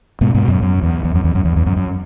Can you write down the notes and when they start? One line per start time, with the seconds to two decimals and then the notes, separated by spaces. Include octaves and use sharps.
0.21 G#2 B2
0.34 G#2 B2
0.48 F#2
0.62 F#2
0.82 E2
1.04 E2
1.15 F#2
1.24 E2
1.35 F#2
1.45 E2
1.56 E2
1.66 F#2
1.76 F#2